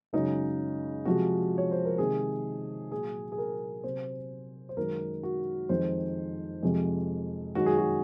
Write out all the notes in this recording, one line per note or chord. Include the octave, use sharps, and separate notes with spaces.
F#2 C#3 G#3 D#4
C3 F3 G#3 F#4
C#5
C5
A#4
C3 D#3 G#3 G#4
A#2 F#3 G#4
G#4
A#4
C3 F#3 C5
C5
F#2 D#3 G#3 A#4
F#4
F2 D#3 G#3 C5
F2 C3 F3 G#3
F#2 D#3 G#3 F#4
G#4
F#4